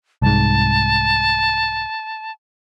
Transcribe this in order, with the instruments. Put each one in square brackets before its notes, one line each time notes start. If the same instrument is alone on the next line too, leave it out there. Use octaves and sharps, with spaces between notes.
[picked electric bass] C2 G#2 [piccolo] A5